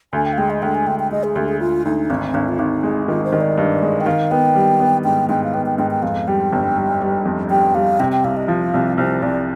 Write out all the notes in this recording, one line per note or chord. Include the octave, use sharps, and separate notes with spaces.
D2 G#5
G5
F5
G#3 G5
D#5
D2 G5
G#5
D2 G5
G5
G#3 D#5
G#4
D2 G4
G#4
D2 F4
D2 D#4
G#1 C4
G#1 D4
F4
G#1 D#4
G#3
D#3 F4
C5
D#3
D5
G2
G#3
G5
D#3 F5
B3 G5
G3
B3
G#2 G5
G#2 G5
F5
B3 G5
G5
G#2 G5
G5
F2 F5
G3 G5
G1
G3
G3
F2
G3 G5
G3 F5
C3 G5
G5
C2 F5
D#5
F3 F5
C2
C2 C5
C2 D5